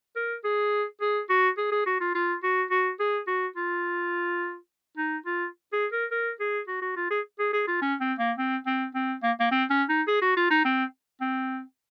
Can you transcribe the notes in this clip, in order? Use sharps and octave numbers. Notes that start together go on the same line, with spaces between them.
A#4
G#4
G#4
F#4
G#4
G#4
F#4
F4
F4
F#4
F#4
G#4
F#4
F4
D#4
F4
G#4
A#4
A#4
G#4
F#4
F#4
F4
G#4
G#4
G#4
F4
C#4
C4
A#3
C4
C4
C4
A#3
A#3
C4
C#4
D#4
G#4
F#4
F4
D#4
C4
C4